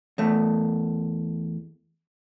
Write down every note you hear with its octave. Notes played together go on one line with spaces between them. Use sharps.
E2 A3